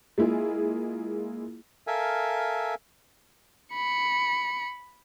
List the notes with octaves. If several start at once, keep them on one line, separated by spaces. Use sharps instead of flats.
G#3 A#3 E4 F4 G#4
A4 A#4 E5 F5 G#5
B5 C#7